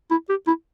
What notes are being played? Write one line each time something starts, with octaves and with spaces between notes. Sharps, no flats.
E4
G4
E4